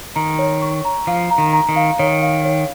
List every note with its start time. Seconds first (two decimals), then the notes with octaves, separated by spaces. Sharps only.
0.16 D#3 A#5
0.39 C#5
0.62 C#6
0.85 A#5
1.07 F3 F5
1.30 A#5
1.38 D#3
1.53 A#5
1.69 D#3
1.76 F5
1.99 D#3 C#5
2.22 F5
2.45 C#5